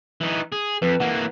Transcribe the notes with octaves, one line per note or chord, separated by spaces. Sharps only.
E3 D#4
G#4
F2 B4
E3 A#3 F#5